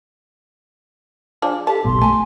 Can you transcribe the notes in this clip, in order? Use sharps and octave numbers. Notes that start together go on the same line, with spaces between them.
F3 G#3 D4
G4 A4 A5
F#1 B1 B2 C6
A3 G#5 A5